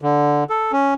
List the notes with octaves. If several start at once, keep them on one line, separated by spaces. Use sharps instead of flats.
D3
A4
C#4